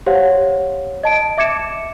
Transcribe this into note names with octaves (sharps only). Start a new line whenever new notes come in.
G4 C5 C#5 F5 F#5
D#5 A5 D7
E5 D6 G#6 C#7 E7